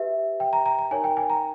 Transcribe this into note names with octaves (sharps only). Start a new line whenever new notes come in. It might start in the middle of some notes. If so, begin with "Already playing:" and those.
Already playing: G4 B4 E5
G5
A#5
A#5
A#5
D#4 A#4 C#5 G#5
G5
G#5
A#5